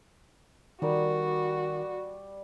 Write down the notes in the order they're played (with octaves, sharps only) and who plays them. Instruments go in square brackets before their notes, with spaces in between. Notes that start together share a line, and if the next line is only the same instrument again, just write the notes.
[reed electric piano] D#3 A#4 [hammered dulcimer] G3 D5 [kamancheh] F#4